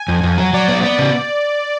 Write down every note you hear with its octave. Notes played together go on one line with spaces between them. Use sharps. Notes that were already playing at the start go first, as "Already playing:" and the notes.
Already playing: G#5
F2
F2
F#3
F#3 D5
B3
B3
C#3